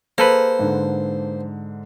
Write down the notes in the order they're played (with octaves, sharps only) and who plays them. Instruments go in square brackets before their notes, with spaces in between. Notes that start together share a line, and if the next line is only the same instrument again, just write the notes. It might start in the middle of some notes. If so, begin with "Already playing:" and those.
[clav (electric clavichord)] A#3 A4 B4 [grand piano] G#4 [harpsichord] C5
[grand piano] G#2 D3